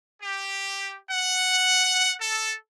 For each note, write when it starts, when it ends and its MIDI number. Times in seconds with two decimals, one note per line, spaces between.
0.21 0.96 67
1.10 2.15 78
2.20 2.54 69